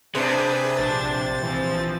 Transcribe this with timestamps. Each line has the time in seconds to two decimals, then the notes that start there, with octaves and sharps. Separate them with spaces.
0.15 C3 D4 G#4 B4 C5 D5
0.77 A#1 D4 A6
1.43 E3 F3 C4